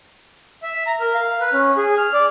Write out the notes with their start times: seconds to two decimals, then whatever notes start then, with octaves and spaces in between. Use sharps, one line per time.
0.63 E5
0.87 A#5
1.00 A#4
1.14 F5
1.41 B4
1.53 C#4
1.77 G#4
1.98 F6
2.13 D5